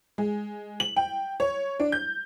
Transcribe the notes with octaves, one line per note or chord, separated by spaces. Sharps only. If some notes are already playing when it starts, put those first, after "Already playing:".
G#3
F#7
G5
C#5
D4
G6